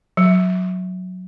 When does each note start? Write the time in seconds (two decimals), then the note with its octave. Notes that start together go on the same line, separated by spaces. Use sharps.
0.17 F#3